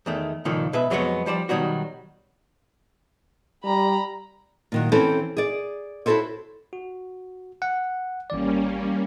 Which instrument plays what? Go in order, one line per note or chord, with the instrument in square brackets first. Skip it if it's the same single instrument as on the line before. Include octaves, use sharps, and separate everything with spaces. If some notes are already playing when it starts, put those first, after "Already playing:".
[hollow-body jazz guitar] E2 D#3 A3
C#2 A#2 D#3 F3 A4
B2 B4 E5
F2 F#3 G#3 B3 A4 C#5
F3 G3 C5 D5
B2 D#3 F#3 G3 F#4
[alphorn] G3 [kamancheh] A#5 B5
[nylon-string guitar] A#2 D#3 F#3
E3 C4 C#4 A4 C5 C#5
G#4 D5
E4 F#4 G4 A4 C5 C#5
[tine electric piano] F#4
F#5
[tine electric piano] G#1 E3 D5 [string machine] G3 A#3 C#4